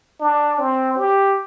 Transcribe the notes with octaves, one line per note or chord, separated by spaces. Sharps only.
D4
C4
G4